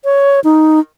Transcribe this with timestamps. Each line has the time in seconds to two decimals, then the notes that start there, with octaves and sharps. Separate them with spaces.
0.04 C#5
0.44 D#4